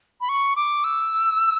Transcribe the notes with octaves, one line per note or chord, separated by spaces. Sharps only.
B5
C#6
D6
E6